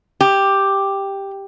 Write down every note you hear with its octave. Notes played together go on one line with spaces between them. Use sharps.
G4